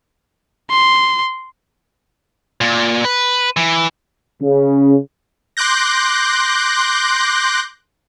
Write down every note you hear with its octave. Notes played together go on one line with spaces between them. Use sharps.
C6
A#2
B4
E3
C#3
C6 D6 F#6 G6 A#6